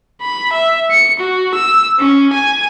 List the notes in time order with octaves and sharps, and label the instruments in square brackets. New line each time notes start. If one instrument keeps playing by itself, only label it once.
[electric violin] B5
E5
C#7
F#4
E6
C#4
G#5